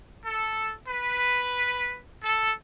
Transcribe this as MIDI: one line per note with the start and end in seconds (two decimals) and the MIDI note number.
0.24 0.73 69
0.88 1.99 71
2.23 2.51 69